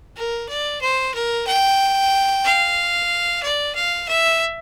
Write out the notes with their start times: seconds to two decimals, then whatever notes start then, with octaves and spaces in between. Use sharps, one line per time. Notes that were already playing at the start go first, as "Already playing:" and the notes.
0.16 A#4
0.48 D5
0.81 C5
1.14 A#4
1.47 G5
2.44 F5
3.42 D5
3.75 F5
4.08 E5